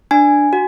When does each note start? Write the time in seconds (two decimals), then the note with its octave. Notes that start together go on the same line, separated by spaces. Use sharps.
0.11 D4 G#5
0.53 F#4